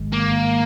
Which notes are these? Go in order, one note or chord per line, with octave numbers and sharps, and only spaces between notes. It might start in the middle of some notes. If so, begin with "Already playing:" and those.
Already playing: A1 G#2 D#3 G#3
A#3